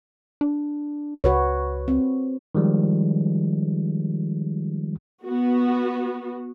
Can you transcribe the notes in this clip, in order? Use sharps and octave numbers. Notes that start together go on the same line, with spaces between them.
D4
C#2 F#4 B4 C#5
C4
D#3 F3 G3 G#3
B3 F#4